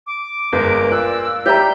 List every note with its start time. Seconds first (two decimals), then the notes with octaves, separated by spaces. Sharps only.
0.07 D6
0.53 G1 G#3 A#4
0.91 A#2 E6 F#6
1.46 G3 G4 C#5 E5 A#5 G6